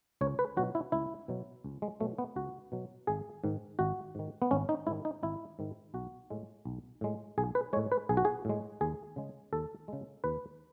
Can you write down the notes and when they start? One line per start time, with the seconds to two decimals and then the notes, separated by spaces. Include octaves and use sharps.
0.21 C#2 C#5
0.39 B4
0.57 B2 F#3 F#4
0.75 E4
0.92 C#2 E4
1.28 B2 F#3
1.64 C#2
1.82 G#3
2.00 B2 F#3 A3
2.18 B3
2.36 C#2 F#4
2.72 B2 F#3
3.07 G#1 G#4
3.44 G#2 D#3
3.79 G#1 F#4
4.15 G#2 D#3
4.42 B3
4.51 G#1 C#4
4.69 D#4
4.87 G#2 D#3 E4
5.05 D#4
5.23 G#1 E4
5.59 G#2 D#3
5.94 B1 F#4
6.30 A2 G#3
6.65 B1
7.01 A2 G#3
7.38 B1 G#4
7.55 B4
7.73 G#3 C#5
7.76 A2
7.92 B4
8.09 B1 G#4
8.17 F#4
8.25 G#4
8.45 A2 G#3
8.81 D#2 G#4
9.16 C#3 G#3
9.53 D#2 A4
9.88 C#3 G#3
10.24 D#2 B4